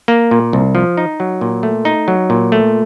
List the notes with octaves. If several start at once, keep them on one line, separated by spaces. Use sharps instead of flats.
A#3
A#2
C2
F3
D#4
F#3
A#2
A3
D#4
F#3
A#2
A3